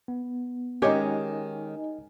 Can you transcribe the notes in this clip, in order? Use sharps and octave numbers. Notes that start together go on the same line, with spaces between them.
B3
D#3 G#3 C#4 D#4 G4 C#5 D#5 G#5